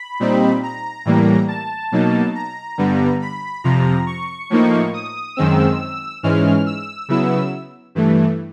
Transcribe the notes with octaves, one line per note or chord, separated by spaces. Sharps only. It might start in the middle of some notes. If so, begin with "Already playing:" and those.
Already playing: B5
A#2 G3 C4 D#4
A#5
A2 E3 G3 A#3
A5
B2 F#3 A#3 D#4
A#5
G2 D3 G3 B3
B5
F2 C3 F3 A#5
C#6
A2 F3 A#3 D#4
D#6
F#2 D#3 G#3 C4 E6
G#2 E3 G#3 C#4 F6
E6
C#3 F#3 B3 E4 E6
G2 E3 A3